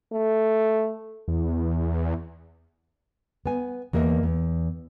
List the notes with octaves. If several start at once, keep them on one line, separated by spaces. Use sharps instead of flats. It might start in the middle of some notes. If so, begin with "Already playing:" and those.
A3
E2
B3 G#5
E2 A#3 A#4 D#5 E5
E2